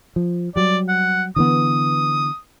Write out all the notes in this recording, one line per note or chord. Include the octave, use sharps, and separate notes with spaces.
F3
F#3 G3 D5
F#5
D3 E3 B3 D#6